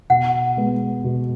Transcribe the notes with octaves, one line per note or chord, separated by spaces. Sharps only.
B2 F#5
G#3 B3
B2